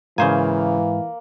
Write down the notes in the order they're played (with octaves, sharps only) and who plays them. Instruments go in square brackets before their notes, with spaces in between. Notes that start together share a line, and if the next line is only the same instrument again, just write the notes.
[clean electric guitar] G#2 [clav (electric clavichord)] C#3 C5 G#5 [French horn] E3 [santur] A#3